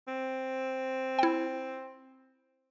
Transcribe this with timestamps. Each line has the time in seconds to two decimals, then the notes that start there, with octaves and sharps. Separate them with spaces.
0.08 C4
1.19 E4 G5